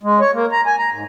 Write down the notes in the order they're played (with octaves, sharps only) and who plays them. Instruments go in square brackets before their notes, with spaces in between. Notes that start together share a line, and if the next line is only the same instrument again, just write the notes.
[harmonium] G#3
C#5
A#3
A#5
G#5
A#5
G#2